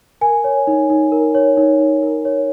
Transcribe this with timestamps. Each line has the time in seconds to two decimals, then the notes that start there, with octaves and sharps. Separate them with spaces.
0.21 A#4 G#5
0.44 C#5
0.67 D#4
0.90 D#4
1.12 A#4
1.34 C#5
1.57 D#4
1.79 D#4
2.03 A#4
2.25 C#5